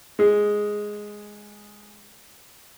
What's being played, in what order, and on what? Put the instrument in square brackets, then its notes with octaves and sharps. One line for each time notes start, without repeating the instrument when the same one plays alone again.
[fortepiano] G#3 G#4